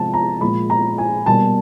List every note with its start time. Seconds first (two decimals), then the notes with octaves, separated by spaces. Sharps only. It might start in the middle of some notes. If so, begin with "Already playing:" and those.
Already playing: C3 F3 G#3 A5
0.13 A#5
0.41 A#2 F3 G#3 B5
0.70 A#5
0.98 G#5
1.26 B2 G3 A#3 A5